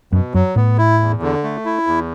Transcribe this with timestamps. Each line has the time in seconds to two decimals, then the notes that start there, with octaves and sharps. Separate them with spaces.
0.12 F#2 B2
0.34 F#2 F#3
0.56 A2 B3
0.78 E4
1.00 E2
1.22 D3
1.43 A3
1.65 E4
1.87 E2